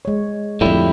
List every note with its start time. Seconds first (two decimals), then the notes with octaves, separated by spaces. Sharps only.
0.05 G#3 C#5
0.61 F2 A2 D3 G3 E4